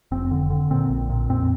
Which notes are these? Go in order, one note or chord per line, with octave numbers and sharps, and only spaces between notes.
F1 C4
D3
D3
A#2 C4
A#1
A#2
F2 C4